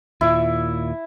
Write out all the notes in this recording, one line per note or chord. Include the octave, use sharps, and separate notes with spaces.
D#2 A#2 E4